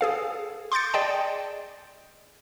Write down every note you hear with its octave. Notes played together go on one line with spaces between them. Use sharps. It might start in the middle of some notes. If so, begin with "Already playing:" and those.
G#4 A4 F5
C6 D6 G6 A6 C#7
G#4 D5 D#5 G5 A5